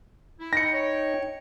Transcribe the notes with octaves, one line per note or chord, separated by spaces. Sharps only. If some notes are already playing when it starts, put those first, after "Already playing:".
E4
D#4 G5 A#6 C#7
C#5